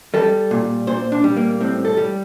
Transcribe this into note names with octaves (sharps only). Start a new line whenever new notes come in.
G3 A4
A#2
A#2 C5
D4
G3
A#3
A2 C4
A4
G3